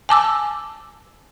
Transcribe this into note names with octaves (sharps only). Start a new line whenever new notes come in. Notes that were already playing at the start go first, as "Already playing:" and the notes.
G#5 A5 D6 E6